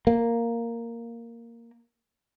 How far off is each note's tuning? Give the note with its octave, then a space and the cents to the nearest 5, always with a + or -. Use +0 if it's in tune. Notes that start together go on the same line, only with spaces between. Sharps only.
A#3 -5